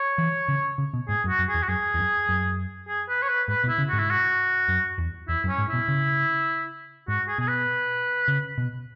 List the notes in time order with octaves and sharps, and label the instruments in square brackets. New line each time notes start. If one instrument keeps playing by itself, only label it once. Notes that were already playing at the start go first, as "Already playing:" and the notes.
Already playing: [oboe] C#5
[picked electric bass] E3
C#3
C#3
B2
[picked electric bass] G#2 [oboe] G#4
[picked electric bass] F#2
[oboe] F#4
[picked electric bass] F#2
[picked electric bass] E2 [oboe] G#4
[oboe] F#4
[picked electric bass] F#2 [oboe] G#4
[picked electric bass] E2
F#2
F#2
[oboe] G#4
B4
C#5
B4
[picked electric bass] G#2 [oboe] B4
[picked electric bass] B2
[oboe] E4
[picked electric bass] C#3
[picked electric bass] G#2 [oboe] F#4
[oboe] E4
F#4
[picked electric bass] F#2
E2
[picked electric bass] E2 [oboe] E4
[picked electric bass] F#2
[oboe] C#4
[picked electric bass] G#2
[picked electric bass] B2 [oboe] E4
[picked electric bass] C#3
[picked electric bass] G#2 [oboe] F#4
[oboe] G#4
[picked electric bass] B2 [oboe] G#4
[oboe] B4
[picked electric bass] C#3
B2